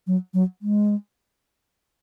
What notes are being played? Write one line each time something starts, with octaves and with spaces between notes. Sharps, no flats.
F#3
F#3
G#3